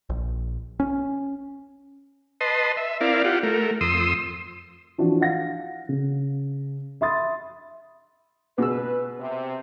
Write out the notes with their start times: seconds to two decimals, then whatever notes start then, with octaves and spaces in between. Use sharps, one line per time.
0.10 A#1
0.80 C#4
2.41 B4 D#5 A5 C6
2.77 E5
3.01 C4 E4 A#4 D5 F5
3.24 F4 G4 F#5
3.43 A3 A#4
3.81 F2 C6 D#6 E6
4.98 E3 F3 D4 F#4
5.21 F5 F#5 A#6
5.89 C#3
7.01 E5 B5 C6 D#6 A6
8.58 B2 G#4 B4 E6
9.20 C3